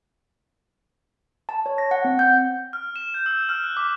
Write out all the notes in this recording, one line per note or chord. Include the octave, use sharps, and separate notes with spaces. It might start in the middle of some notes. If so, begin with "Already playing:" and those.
A5
C#5
A#6
F#5
C4
G6
F6
E7
G6
E6
F6
F#6
D6